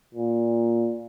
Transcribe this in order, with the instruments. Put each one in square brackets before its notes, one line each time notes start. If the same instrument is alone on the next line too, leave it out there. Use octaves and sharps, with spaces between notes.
[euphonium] A#2